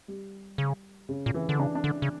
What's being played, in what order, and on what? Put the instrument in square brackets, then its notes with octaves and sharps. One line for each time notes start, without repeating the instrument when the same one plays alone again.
[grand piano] G3
[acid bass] C#3
[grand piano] C#3
[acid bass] A#2
[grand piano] E3
[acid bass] D3
[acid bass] C#3 [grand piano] D4
[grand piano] D4
[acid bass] D3
C#3